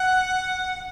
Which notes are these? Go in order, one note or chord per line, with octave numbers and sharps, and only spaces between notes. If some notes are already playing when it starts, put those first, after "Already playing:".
Already playing: F#5